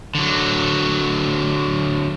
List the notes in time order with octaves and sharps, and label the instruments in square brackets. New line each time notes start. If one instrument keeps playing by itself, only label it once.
[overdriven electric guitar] D3 F#3